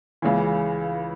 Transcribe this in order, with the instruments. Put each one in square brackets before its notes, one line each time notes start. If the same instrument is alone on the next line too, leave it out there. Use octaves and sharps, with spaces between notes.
[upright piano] C#2 C#3 E3